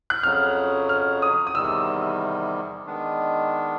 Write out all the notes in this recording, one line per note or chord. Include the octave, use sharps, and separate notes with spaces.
F#6
F2 C#3 F#3 F6
F6
D#6
D#6
E2 C3 D#3 G3 E6
D#3 G#3 B3 D4